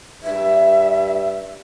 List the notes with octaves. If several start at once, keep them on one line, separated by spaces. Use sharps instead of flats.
G2 E5